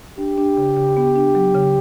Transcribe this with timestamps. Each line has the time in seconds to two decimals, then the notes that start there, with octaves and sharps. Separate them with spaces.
0.18 D4 G4
0.38 D4
0.57 C#3
0.77 C#3
0.97 B3
1.16 D4
1.35 F#3
1.55 C#3